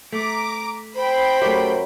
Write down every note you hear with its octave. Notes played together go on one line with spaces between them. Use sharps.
A3 A#5 D6
C5 G5 B5
F#2 A3 G4